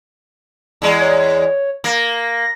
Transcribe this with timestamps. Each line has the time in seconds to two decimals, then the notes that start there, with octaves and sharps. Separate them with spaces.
0.82 E2 G#3
1.01 C#5
1.84 A#3 A#6